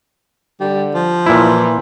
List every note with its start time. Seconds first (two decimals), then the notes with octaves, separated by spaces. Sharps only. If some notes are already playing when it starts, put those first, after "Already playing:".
0.60 D3 G3
0.95 F3
1.26 A#2 E3 E4